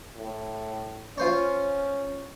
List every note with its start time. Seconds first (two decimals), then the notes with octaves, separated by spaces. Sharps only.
0.16 A2
1.18 C#4 F4 C5 C#5